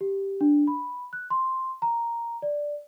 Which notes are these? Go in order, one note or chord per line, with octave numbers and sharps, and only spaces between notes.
G4
D4
B5
F#6
C6
A#5
D5